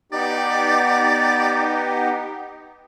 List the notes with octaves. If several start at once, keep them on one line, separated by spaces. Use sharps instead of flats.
B3 D#4 G4 D5